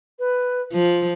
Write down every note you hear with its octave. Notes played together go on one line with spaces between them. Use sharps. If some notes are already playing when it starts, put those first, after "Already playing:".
B4
F3 F4